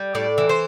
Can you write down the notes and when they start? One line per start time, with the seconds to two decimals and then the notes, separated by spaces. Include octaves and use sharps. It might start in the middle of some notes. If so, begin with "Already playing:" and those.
Already playing: G3
0.15 A2 D5
0.38 E3
0.49 C5